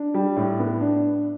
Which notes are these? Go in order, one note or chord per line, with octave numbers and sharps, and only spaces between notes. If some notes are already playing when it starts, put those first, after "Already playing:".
Already playing: D4
G3
A2
B3
D4